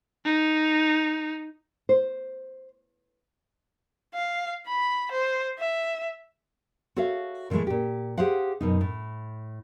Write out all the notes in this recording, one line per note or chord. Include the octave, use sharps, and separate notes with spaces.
D#4
C5
F5
B5
C5
E5
F#4 A4 C#5 E5 F5
A#2 E3 F3 G#3 A3
A#2 G4
G4 G#4 C5 F5 F#5
F#2 B2 D#4
A2